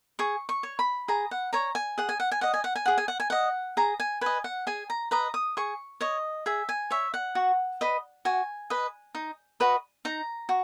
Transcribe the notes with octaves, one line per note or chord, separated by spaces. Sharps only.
G#4 C#6
C#6
C#5
B5
G#4 A#5
F#5
C#5 A#5
G#5
G#4 F#5
G#5
F#5
G#5
D#5 F#5
G#5
F#5
G#5
G#4 F#5
G#5
F#5
G#5
D#5 F#5
G#4 A#5
G#5
B4 D#5 G#5
F#5
G#4 G#5
A#5
B4 D#5 A#5
D#6
G#4 C#6
C#5 D#5
G#4 E5
G#5
C#5 E5
F#5
F#4
B4 D#5
F#4 G#5
B4 D#5
D#4
F#4 B4 D#5
D#4 A#5
F#4